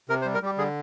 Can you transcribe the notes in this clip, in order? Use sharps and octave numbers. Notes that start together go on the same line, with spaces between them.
C3 A#4
C5
G3
A#4
G3 G4
D3 G#4